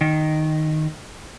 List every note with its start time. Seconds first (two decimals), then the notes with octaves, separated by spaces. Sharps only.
0.01 D#3